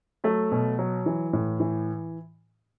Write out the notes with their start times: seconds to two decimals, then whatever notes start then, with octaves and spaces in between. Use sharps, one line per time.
0.24 F#3 A3
0.52 B2
0.79 F#3
1.06 E3
1.33 A2
1.60 E3